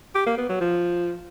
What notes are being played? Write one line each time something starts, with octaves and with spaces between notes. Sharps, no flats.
G4
A#3
B3
F#3
F3